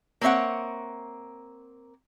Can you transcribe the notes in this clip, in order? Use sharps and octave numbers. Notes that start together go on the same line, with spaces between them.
A#3 C4 C#5 E5 F#5